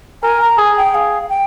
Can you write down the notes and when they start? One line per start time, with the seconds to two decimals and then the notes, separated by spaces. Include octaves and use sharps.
0.23 A#4 G#5
0.41 A#5
0.58 G#4 G#5
0.77 G5
0.93 G#4 F5
1.29 G5